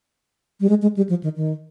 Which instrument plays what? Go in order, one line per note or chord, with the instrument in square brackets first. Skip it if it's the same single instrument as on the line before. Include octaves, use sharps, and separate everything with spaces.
[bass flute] G3
G#3
G#3
G3
F3
D#3
D#3